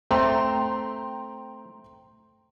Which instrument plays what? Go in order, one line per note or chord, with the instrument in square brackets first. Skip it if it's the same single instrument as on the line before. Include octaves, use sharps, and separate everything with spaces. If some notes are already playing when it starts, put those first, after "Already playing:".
[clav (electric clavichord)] A3 C4 [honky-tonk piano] G5 A#5 C6